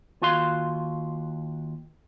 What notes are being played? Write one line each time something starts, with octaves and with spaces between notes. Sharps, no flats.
D#2 F4 F#4 F5 C6